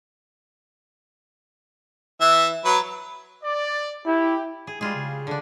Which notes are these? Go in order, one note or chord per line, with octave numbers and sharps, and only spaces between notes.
E3 E5
F#3 B4
D5
E4 G4
G#4
G3 G#3 F4 G#4
C#3
D3 D4